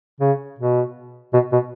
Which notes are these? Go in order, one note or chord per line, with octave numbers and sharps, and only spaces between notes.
C#3
B2
B2
B2